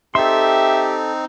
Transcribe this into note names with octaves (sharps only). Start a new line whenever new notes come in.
C4 D#4 G4 A4 E5 C6